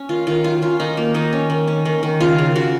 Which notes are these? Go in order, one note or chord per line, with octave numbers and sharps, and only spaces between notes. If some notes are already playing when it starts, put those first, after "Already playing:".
Already playing: C#4
D#3 F4
D#3 F4
F#3 F4
C#4 F4
D#3 D#4
A#3
D#3 D#4
C#4
D#3
C#4
D#3
D#3
C#3 F4
C#3
C#3 F#4